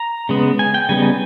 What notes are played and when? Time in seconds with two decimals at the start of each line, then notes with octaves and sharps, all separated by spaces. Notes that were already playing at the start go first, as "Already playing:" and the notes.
Already playing: A#5
0.29 C#3 G#3 B3
0.59 G#5
0.74 G5
0.89 C#3 G3 B3 D#4 G#5